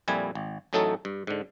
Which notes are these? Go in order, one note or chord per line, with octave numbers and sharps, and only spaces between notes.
F2 A#2 G3 E4 G#5
G#1
A1 A2 F#3 A3 D#4 A4
G2
G#2 D3